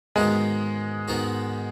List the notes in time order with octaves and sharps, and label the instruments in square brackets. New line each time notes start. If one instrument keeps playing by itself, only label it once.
[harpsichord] G#2 D#3 B3 D#4 F#4 [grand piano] G#3
[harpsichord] G#2 D#3 B3 D#4 F#4